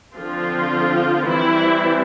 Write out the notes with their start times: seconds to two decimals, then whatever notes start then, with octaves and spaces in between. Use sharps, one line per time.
0.15 D3 F3 C4 F4
1.27 E3 G3 C4 E4